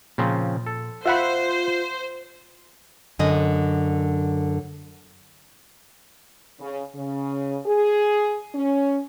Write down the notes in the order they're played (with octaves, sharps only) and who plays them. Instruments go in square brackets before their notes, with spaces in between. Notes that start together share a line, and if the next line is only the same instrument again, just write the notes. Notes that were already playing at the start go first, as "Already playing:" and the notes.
[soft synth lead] A#2 [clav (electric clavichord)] C#3 F3 C4
[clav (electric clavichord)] A4
[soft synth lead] F4 [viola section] C5 [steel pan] E5 F#5 B5
[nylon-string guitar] F#2 D3 D#5
[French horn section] C#3
C#3
G#4
C#4